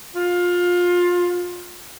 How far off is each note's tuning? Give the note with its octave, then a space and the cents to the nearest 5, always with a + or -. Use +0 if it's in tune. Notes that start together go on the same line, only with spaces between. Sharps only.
F4 +20